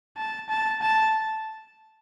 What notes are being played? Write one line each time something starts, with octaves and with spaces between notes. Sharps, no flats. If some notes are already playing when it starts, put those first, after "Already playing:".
A5
A5
A5